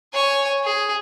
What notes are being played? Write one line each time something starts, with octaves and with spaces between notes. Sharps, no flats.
C#5 G#5
G#4